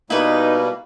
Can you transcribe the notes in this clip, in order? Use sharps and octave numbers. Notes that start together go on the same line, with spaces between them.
B2 G3 A#3 D#4 E4 B4